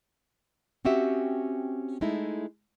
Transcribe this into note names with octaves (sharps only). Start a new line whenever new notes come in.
C4 C#4 F#4 G4 E5
G#3 A3 D#4 E4